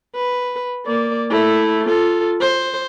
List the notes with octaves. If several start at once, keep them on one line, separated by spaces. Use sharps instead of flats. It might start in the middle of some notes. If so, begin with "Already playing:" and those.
B4
A#3 D5
A3 E4
F4 A4
C5